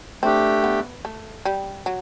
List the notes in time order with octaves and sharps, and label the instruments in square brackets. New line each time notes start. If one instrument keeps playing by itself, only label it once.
[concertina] A3 D4 G4 [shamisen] C4
[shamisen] B3
A3
G3
F#3